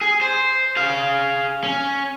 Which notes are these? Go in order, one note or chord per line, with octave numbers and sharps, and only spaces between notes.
G#4
C5
G#4 F5
C#4